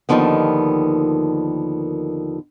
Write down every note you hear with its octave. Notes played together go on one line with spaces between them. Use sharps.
D#2 B2 D3 D#3 F3 B3